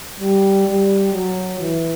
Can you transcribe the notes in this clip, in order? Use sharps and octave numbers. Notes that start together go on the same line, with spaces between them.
G3
G3
F#3
E3